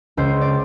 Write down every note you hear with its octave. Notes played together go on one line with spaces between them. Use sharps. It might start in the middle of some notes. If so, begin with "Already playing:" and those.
C#2 C5
D5